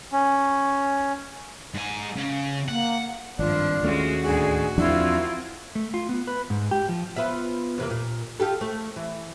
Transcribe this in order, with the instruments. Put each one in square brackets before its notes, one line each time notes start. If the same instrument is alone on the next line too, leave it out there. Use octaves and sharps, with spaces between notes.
[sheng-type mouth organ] C#4
[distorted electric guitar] G#2 G#5
C#3
[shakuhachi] A#3 [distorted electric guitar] F#5
[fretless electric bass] G#1 [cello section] G2 F3 [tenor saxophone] D4 [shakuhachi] F4
[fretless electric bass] D#2 A3 C#4 [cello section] G#3 F#4
[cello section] D2 A2 G#3 [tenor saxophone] F#4 [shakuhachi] G#4
[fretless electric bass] E2 F3 D4 [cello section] C4 F4 A#4 [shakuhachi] E4
[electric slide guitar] A3
F4
B3
B4
G#2
G4
F3
[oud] B3 F4 E5
E2 C3 A#3
A#2
F4 G4 A4
A3
E3